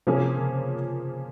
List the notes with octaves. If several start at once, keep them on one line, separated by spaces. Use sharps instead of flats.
C3 F3 A#3 C#4 G#4
C#3